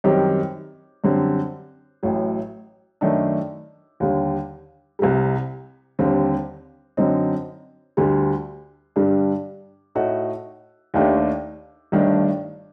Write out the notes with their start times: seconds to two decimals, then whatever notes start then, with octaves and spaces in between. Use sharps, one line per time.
0.04 F#2 D#3 G3 C4 G4
1.04 F#2 D3 G3 C4
2.03 A1 A2 F#3
3.01 F#2 D#3 A3 D4
4.00 D#2 D3 G3
4.99 C2 C3 G3
5.99 D#2 D3 G3 C4
6.97 F#2 D3 F#3 C4 D#4
7.97 D2 D3 G3
8.96 G2 D3 G3 D4
9.95 A2 A3 D#4 F#4
10.94 D#2 D#3 A3 D4 G4
11.92 G1 G2 D#3 A3 D4